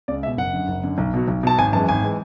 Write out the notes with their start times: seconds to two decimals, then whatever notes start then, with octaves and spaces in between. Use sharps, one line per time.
0.08 C#2 D5
0.23 G#3 E5
0.27 B2
0.38 F#1 F#5
0.53 F#2 D3
0.68 F#1
0.83 F#2 D3
0.98 B1
1.14 B2 F#3
1.28 B1
1.43 B2 F#3 A5
1.58 G#1 G#5
1.73 F#2 E3 G#3 A5
1.88 G#1 G#5
2.03 E3 G#3